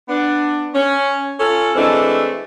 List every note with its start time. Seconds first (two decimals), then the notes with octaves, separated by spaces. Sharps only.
0.09 B3 D4
0.74 C#4
1.39 C#4 F4 A4
1.75 E3 G#3 A3 C4 D4